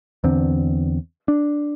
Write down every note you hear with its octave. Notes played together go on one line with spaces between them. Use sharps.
E2 D3 C4
D4